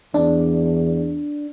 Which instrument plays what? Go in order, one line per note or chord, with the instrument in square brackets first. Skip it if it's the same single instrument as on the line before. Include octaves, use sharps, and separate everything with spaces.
[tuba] E2 [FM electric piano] D4